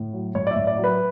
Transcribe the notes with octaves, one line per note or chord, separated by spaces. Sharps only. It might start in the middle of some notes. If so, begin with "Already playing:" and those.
Already playing: A2
F#3
A2 C#5
D5
A2 E5
D5
F#3
B4